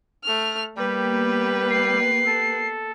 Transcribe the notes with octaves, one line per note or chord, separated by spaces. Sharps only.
A3 F6
G3 A#3 B3 G4 B4
C7
A4